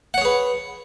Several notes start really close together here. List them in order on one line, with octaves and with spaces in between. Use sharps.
F#5 C#5 G#4 B4